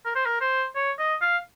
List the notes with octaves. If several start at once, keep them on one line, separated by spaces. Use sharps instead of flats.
A#4
C5
A#4
C5
C#5
D#5
F5